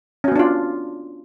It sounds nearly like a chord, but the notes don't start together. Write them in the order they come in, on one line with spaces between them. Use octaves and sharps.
C#4 F#4 B3 D4 F4